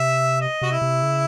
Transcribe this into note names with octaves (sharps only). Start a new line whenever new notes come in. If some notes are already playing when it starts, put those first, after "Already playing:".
Already playing: C3 E5
D#5
C3 F#4
E4
C3
C#3